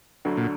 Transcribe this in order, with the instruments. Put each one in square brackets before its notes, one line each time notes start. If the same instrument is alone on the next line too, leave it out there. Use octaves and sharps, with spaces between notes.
[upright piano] D2 D3 F#3
[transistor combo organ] A#2